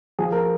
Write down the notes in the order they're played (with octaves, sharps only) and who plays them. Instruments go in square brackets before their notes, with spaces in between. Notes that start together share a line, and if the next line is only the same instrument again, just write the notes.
[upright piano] F3 G#4
A#4